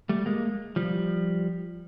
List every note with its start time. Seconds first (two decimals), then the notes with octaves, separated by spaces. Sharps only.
0.09 G3 A3
0.26 G#3 A#3
0.76 F3 G3